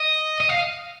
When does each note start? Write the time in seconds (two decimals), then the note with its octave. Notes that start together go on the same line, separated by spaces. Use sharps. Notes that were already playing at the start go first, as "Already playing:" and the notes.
Already playing: D#5
0.40 D#5
0.49 F5